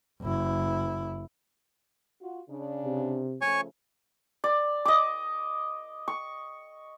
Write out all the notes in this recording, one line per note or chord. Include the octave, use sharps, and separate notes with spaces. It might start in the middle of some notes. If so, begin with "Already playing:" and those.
F#1 E4
F4 F#4
C#3 D4
C3
C#3 F3 A3 C#5 G#5 C#6
D5
D#5 D6
C#6